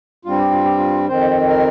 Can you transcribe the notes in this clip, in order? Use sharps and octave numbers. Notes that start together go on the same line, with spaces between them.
G2 G3 C4 F4
G4
F4
G4
F4
F2 D#3 C4 C5
A#4